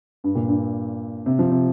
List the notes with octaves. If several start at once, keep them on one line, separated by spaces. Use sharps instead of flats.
G2
A#2
G2
C3
F3
C3